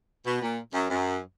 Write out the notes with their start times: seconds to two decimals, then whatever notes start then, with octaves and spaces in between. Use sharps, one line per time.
0.25 B2
0.42 A#2
0.73 F#2
0.90 F#2